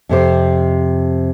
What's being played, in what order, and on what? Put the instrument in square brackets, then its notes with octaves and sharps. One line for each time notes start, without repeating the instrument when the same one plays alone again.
[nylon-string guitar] F2 C3 C5